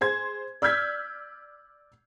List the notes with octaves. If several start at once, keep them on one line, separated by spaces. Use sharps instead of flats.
G#4 C5 G#6
D5 E6 F6 G6 G#6 B6